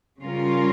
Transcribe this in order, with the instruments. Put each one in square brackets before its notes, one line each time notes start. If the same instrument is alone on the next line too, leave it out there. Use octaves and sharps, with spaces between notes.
[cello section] C#3 G3 C#4 F4 A#4